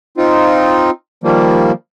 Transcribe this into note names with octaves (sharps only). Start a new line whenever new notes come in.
C4 D#4 F4
D#3 F3 G3 A#3